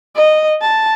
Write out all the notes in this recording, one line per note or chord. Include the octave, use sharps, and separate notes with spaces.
D#5
A5